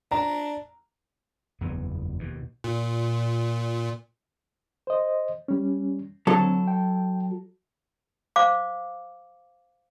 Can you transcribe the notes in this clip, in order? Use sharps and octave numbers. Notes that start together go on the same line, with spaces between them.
D4 A#5
F#1 E2 E3 B3
D#2 B2
A#2
C5 D#5
G3 C#4
D3 F#3 C4 A4
G5
C5 F5 D6